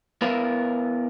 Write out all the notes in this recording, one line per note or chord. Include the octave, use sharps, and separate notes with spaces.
B3 E4 A#4 F5